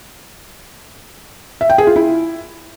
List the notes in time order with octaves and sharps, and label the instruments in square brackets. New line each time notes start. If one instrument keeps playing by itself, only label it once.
[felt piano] E5
G5
G#4
F4
E4